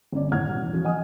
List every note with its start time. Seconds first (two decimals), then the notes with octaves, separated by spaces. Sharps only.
0.12 G1 C#4 D5
0.32 G#1 A2 C#5 F#5 F6 G#6
0.46 B2 G3
0.62 E2
0.73 E3 F3 C#4 F4 F#4
0.85 D#5 F#5 G#5 D#6